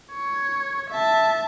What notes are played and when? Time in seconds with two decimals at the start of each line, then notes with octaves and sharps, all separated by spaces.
0.12 C#5
0.90 E5 A5